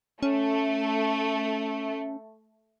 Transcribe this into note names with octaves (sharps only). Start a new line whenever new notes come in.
A3 C#4